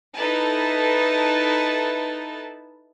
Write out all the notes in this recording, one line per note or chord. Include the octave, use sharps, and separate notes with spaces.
D#4 E4 A4 B4 A5